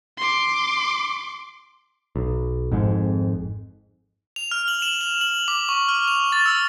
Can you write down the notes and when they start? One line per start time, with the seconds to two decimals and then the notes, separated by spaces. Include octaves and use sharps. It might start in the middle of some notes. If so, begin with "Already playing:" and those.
0.18 C6 D6
2.16 B1
2.71 G#1 F2 G#2
4.36 F7
4.51 F6
4.68 F#7
4.82 E7
5.01 F7
5.21 F#7
5.48 D6
5.69 C#6
5.88 F6
6.08 F7
6.32 A6
6.46 E6